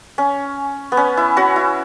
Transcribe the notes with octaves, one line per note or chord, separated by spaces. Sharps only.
C#4
B3
C#4
E4
C#4 F#4
E4